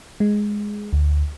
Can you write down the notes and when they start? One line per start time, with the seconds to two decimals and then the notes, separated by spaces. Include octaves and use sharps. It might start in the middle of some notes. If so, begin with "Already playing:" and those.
0.20 G#3
0.93 D2